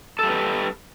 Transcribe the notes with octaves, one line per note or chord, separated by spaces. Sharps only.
G3 A4 B4